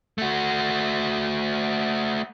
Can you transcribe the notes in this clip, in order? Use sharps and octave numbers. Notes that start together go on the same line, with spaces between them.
A3 F#4